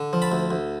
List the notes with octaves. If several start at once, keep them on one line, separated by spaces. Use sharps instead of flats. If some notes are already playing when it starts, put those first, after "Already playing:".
Already playing: D3
F3
A5 B5
D2
D2